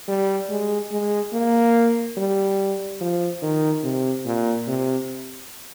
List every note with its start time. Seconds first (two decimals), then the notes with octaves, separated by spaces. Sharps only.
0.08 G3
0.50 G#3
0.91 G#3
1.33 A#3
2.17 G3
3.01 F3
3.42 D#3
3.83 C3
4.25 A#2
4.68 C3